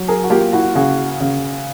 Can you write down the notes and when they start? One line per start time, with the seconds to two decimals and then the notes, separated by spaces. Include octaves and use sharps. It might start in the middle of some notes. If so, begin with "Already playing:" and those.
Already playing: F#3
0.08 G#4 A#4
0.24 F#4
0.30 A#3 F4 G4
0.53 E4 F#4
0.75 C#3 F#4 G#4
1.20 C#3